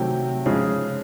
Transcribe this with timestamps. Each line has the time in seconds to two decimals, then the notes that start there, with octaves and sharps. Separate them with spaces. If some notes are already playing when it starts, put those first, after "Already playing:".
Already playing: C3 D#3 F#3 A3 G5
0.46 C#3 F3 G#3